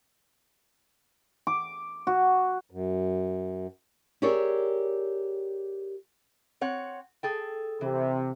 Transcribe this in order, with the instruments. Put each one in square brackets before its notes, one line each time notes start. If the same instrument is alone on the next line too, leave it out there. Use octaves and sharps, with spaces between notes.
[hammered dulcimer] D6
F#4
[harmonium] F#2
[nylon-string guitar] G4 G#4 A#4 C#5 D5 E5
[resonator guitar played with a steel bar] C4 C#5 F#5
G#4 A4 G5
[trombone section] C3 [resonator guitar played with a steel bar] E3